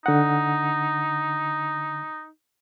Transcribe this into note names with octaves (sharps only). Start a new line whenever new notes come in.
D3 D#4 F#5